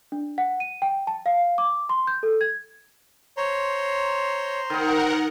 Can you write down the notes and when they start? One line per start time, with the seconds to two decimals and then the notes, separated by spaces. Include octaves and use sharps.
0.12 D4
0.38 F#5
0.60 D#7
0.82 G5
1.07 A5
1.26 F5
1.58 D6
1.89 C6
2.07 G6
2.23 A4
2.41 G#6
3.37 C5 C#5 A#5 C6
4.70 D#3 D#4 A#4 F#5